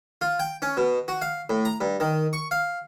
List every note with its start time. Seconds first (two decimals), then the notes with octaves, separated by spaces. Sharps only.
0.21 F4
0.39 G5
0.62 C#4
0.77 B2
1.08 F#4
1.22 F5
1.50 A2
1.65 A#5
1.81 G2
2.00 D#3
2.33 C#6
2.51 F5